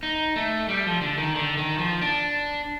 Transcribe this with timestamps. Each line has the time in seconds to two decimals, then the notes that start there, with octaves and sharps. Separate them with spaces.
0.03 D#4
0.36 A3
0.68 G3
0.86 F3
1.01 D3
1.18 D#3
1.35 D3
1.57 D#3
1.79 F3
2.01 D4